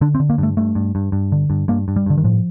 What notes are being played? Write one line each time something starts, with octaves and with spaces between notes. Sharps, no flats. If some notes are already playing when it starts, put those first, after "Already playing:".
D3 D4
C4
D3
A#3
G2 A3
G2 A3
G2
G2
G2
D3
G2
G2 A#3
G2
G3
G2 D3
D#3
A2 F3